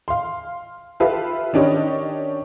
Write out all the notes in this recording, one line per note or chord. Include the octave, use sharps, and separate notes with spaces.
F5 C6
F4 G4 A4 B4 E5 F5
D#3 C#4 D4 G4 C#5 D#5